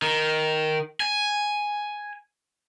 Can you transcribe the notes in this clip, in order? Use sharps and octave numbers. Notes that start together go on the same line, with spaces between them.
D#3
G#5